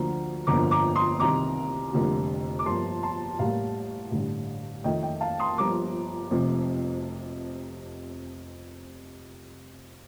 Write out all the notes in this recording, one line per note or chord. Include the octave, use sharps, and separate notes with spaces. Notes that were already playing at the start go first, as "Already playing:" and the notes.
Already playing: D2 D3 F3 A#3 A#5
G1 F2 D3 F3 A#3 A#5 D6
A#5 D6
C6 D#6
C2 C3 D#3 A#5 D6
F1 F2 D3 G3 A#3
D6
G1 G2 F3 A#3 A5 C6
A5 C6
A1 A2 G3 A#3 F5 A5
A1 G2 D3
F2 D#3 A3 D#5 G5
D#5 G5
F5 A5
C6 D#6
G1 G2 F3 A#3 A#5 D6
F1 F2 C3 F3